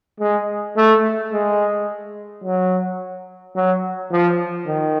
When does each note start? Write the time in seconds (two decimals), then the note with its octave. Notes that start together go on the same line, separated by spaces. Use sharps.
0.20 G#3
0.76 A3
1.32 G#3
2.44 F#3
3.56 F#3
4.12 F3
4.67 D#3